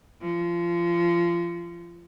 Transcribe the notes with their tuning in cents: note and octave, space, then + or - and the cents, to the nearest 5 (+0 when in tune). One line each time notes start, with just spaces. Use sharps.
F3 -25